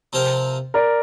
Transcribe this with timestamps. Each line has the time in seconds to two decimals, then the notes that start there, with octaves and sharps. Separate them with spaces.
0.13 C3 F3 C4 F4 A#4
0.74 A#4 D5